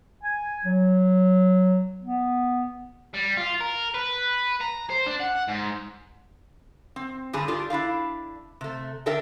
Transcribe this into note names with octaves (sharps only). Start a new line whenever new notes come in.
G#5
F#3
B3
G3
F4
A#4
B4
A#5
C5
D4
F#5
G#2
C4
G2 D3 G#4 A5
D4 F4 G4 A4
D4 E4 D5 F5
C3 A3
D3 D4 A4 A#4 E5 G5